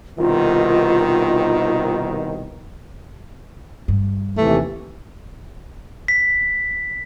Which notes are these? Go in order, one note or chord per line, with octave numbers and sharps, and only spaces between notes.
C2 B2 D#3 F4
G2
D#2 C3 E3 A3
B6